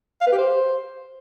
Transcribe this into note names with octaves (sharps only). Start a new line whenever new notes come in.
F5
B4
G4
C5